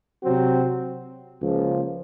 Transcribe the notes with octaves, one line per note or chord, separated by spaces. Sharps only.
C3 F#3 C4 F#4
C#2 C#3 F3 A#3